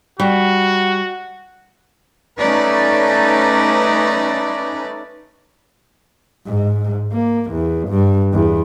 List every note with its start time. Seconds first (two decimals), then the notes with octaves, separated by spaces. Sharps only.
0.20 G3 F#4
2.38 A3 C#4 D#4 B4 D5
6.47 G#2
7.13 A#3
7.52 E2
7.89 G2
8.33 E2